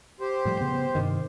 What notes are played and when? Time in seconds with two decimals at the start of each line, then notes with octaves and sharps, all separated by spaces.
0.20 G4 C5
0.45 A2 F3 G3
0.60 C#3 B3
0.95 G2 C3 D#3